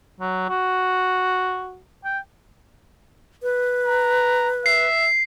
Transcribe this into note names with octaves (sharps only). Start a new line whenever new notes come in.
F#3
F#4
G5
B4
A#5
E5 C7